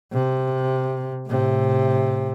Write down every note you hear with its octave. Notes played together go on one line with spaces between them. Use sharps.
C3
A2 C3